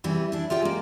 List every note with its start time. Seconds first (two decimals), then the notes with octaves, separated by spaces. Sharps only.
0.04 C3 E3 G3
0.32 D4 E4
0.50 F4 G4 D5 G5
0.62 G#3 A#3